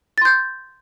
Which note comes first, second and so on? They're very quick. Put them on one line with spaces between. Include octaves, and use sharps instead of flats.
A6 C6 G6